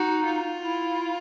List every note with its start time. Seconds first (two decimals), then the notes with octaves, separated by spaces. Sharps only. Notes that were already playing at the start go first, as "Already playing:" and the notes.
Already playing: D#4 F#4
0.25 F4
0.61 E4